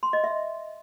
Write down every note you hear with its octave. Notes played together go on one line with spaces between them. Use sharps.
C6
D#5
E5